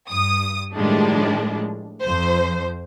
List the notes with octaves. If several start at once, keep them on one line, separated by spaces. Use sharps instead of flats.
G2 D#6
A2 D#3 F3 G3 G#3 D4
F2 F3 C5